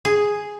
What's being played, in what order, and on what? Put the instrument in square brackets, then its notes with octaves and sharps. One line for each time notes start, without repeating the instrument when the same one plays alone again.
[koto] G#4